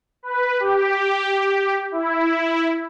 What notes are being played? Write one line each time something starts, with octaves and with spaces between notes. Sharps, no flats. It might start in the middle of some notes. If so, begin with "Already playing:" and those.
B4
G4
E4